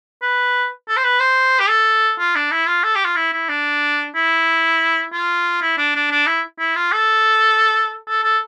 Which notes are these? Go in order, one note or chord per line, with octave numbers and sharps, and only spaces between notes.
B4
A4
C5
B4
C5
G4
A4
F4
D4
E4
F4
A4
G4
F4
E4
E4
D4
E4
F4
E4
D4
D4
D4
E4
E4
F4
A4
A4
A4